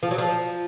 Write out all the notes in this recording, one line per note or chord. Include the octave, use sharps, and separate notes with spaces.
F3
F#3
F3